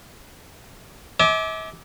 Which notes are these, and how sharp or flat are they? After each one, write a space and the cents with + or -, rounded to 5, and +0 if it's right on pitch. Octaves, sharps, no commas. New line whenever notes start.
E5 -45 G#5 +40 D6 +0